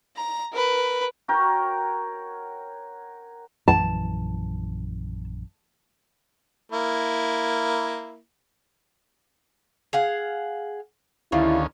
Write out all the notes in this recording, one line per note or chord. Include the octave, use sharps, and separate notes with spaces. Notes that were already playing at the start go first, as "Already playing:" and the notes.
A#5
A#4 B4
F#4 A#4 C#5 G5
A#1 F#2 E3 A5
A#3 E4
G#4 F5 F#5
D2 D#3 G3 C#4 E4 F4